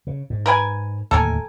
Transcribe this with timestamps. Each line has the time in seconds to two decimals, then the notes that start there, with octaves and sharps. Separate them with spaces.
0.07 C#3
0.30 G#2
0.46 A#4 B4 G#5
1.11 D1 D#2 A4 A#4 G#5